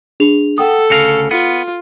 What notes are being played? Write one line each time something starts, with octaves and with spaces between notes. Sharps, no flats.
D4 G#4 F7
A4 F#5 G5 D#6
D2 C#3 F5 A#6 C#7
B3 F4